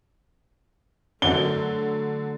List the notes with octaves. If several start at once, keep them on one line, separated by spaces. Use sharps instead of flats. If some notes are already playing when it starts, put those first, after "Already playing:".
D3 F#3 A3 G7